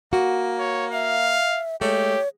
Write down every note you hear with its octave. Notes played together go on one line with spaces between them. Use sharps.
A#3 F#4
C#5
E5 F5
G#3 A3 G4 C#5